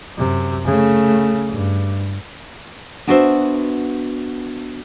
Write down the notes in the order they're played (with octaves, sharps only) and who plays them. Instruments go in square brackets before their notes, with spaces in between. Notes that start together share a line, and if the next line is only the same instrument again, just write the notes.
[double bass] F#2 C3
C#3 A3
G2
[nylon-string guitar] B3 D4 F#4 B4 C5 E5